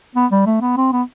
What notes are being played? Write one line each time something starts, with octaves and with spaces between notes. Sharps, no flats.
B3
G3
A3
B3
C4
B3